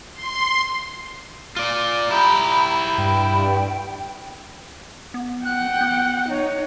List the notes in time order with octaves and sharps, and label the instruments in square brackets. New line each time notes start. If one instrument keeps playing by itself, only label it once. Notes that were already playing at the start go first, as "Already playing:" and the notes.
[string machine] C6
[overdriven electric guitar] F4 D5
[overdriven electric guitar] E4 G4 [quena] A#5 [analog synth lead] B5
[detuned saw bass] G2 [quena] G5
[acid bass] B3
[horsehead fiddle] F#5 G5 [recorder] F#6
[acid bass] B3
[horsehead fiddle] D#4 [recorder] C#5